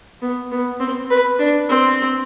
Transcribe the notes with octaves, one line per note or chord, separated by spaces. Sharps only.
B3
B3
C4
B4
D4
C4